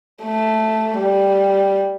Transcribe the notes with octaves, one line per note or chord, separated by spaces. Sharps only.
A3
G3